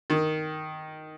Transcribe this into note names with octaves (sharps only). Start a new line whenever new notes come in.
D#3